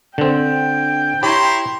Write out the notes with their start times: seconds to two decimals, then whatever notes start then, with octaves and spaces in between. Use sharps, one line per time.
0.18 D3 C4 G5
1.23 E4 G4 C#5 A#5 C6